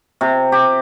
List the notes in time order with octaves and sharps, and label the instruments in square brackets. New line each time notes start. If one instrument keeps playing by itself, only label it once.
[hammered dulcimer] C3
G4